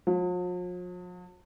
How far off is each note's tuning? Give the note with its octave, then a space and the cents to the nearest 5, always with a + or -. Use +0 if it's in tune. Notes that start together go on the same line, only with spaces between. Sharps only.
F3 +45